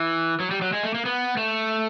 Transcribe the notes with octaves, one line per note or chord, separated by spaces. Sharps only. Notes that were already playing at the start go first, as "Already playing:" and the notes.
Already playing: E3
F#3
G3
F#3
G#3
A3
A#3
B3
A3